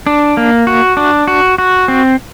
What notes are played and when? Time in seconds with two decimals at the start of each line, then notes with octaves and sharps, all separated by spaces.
0.07 D4
0.37 A#3
0.67 F#4
0.97 D4
1.28 F#4
1.58 F#4
1.88 C4